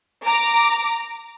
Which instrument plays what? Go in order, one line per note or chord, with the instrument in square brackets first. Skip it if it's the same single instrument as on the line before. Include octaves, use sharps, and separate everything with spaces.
[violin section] A#5 D6